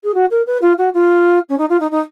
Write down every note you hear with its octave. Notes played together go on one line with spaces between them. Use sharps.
G#4
F#4
A#4
B4
F4
F#4
F4
C#4
D#4
F4
D#4
D#4